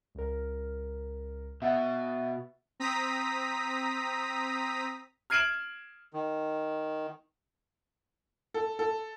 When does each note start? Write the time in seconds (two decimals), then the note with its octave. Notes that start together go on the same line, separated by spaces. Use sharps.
0.15 C#2 A#4
1.62 B2 E5 F#5 A6
2.80 C4 A#5 D#6 B6
5.30 F6 G#6 C7 D7 E7 F#7
6.13 D#3
8.54 A4
8.79 A4